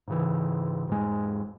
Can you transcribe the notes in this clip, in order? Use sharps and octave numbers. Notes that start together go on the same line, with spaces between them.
G#2 C#3 E3
E1 G#2 G#3